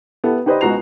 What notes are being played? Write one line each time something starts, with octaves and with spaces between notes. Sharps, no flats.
B3 E4 G4 A4
D#4 G4 B4 C5 D5 D#5
C#2 B2 F#4 A#5 C7 F7